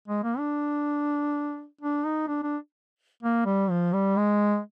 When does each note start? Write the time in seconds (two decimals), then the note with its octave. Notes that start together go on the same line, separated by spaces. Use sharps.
0.08 G#3
0.24 A#3
0.38 D4
1.81 D4
2.05 D#4
2.28 D4
2.43 D4
3.23 A#3
3.46 G3
3.70 F3
3.93 G3
4.17 G#3